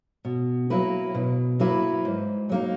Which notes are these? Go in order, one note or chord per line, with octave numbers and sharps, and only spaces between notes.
B2
F#3 A#3 E4 B4
B2
F#3 A#3 E4 B4
G#2
F#3 A#3 D#4